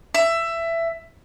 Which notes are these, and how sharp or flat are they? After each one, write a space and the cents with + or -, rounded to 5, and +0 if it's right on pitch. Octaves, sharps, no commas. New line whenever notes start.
E5 +15